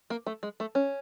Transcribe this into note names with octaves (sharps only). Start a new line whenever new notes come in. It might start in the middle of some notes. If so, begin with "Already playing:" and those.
A#3
A3
G#3
A3
C#4